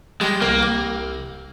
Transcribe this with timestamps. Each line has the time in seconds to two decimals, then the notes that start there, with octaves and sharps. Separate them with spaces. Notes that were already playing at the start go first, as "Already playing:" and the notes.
0.21 G3 G#3
0.42 C2 A#3
0.63 C2